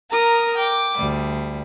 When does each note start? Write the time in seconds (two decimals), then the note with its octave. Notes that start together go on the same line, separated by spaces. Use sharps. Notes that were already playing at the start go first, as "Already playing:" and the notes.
0.10 A#4 A#5 D#6
0.57 G5 D6
0.97 D2 G3